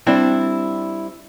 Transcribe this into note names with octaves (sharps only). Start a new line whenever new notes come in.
G3 C4 D4 E4